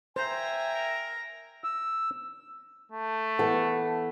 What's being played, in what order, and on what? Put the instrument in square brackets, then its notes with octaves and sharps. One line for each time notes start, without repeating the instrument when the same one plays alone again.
[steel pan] C5 [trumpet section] E5 G5 G#5 [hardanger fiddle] A#5
[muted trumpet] A#4
[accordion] E6
[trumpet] A3
[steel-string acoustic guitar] E3 B3 A4